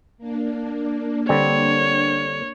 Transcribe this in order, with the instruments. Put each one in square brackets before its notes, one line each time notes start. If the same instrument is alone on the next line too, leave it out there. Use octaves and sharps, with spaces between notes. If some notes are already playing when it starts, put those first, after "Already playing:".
[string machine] A#3 D4
[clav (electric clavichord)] D3 G3 C4 [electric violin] C#5